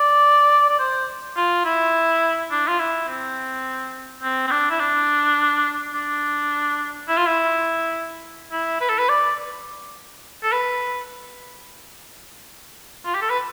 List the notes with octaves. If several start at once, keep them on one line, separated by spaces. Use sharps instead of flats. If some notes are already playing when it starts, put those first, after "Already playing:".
Already playing: D5
D5
C5
F4
E4
D4
F4
E4
C4
C4
C4
D4
E4
D4
D4
E4
F4
E4
E4
B4
A4
B4
D5
A4
B4
F4
G4
A4
B4